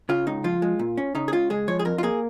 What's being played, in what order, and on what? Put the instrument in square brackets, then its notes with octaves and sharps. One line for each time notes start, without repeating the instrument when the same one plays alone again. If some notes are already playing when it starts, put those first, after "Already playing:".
[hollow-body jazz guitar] C#3 F4
C#2 D#4
F3 F4
G#3
A#2
C#4
C#3 D#4
G#4
C#2 F4
G#3 G#4
F3 C#5
G#4
F2 A#4
F4
A#3 G#4